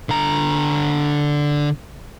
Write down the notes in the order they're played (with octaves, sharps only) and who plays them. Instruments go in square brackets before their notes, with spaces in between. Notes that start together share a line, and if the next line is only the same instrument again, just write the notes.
[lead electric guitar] D3 A#5